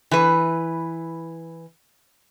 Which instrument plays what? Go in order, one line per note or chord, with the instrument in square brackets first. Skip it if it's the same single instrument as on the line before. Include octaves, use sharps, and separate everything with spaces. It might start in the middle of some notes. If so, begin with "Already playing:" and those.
[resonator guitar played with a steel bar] E3 B4